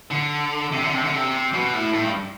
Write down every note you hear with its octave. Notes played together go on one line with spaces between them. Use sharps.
D3
C3
D3
C3
D3
C3
B2
A2
A2
G2